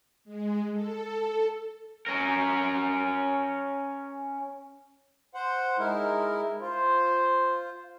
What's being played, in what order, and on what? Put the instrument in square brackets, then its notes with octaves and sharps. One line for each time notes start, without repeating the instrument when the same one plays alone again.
[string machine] G#3
A4
[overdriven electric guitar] C#4 A#4
[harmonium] C5 F#5
[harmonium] G#3 E4 A#4 [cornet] D#4
[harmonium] F4 [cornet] C5